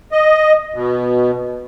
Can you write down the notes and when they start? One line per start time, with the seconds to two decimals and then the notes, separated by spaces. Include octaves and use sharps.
0.12 D#5
0.74 B2